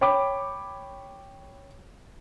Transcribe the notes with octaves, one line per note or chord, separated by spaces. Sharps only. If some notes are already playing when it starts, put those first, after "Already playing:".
C#5 G5 B5 D6